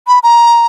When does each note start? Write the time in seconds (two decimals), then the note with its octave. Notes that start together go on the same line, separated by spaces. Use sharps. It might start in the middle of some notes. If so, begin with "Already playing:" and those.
0.08 B5
0.23 A#5